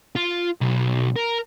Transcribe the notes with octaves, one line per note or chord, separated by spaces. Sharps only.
F4
B1
A#4